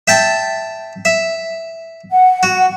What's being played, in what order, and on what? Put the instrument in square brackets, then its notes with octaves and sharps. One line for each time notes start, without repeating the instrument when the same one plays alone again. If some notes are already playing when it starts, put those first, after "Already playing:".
[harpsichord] E5 G5 A5
E5
[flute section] F#5
[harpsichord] F#4